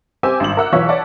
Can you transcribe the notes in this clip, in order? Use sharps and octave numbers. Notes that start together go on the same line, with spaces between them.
C4 G4 G#5 D6 E6 G6
G#1 G2 E6 E7 F#7
A#4 E5 F#5 E6 F#6
B1 E3 F4 C#5 C#6 B6
C#5 D5 F#5 A5